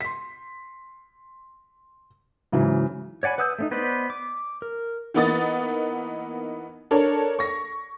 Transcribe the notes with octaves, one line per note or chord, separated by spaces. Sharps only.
C6 B6
G#2 C#3 E3 F#3
C#5 D5 F#5 G#5 B5
B4 F#5 D#6 E6 G6
A3 C4 D#4
B3 B4 C5 D5 D#5
D6
A#4
E3 A#3 B3 D#4 D#6 A6
D4 A4 A#4 C#5
C#6 A#6